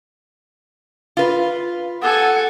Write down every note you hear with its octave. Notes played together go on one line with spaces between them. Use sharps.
F4 B4
A4 F#5 G#5